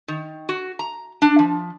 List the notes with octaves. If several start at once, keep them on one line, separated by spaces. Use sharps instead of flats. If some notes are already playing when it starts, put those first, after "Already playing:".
D#3
F#4
A#5
D4
F3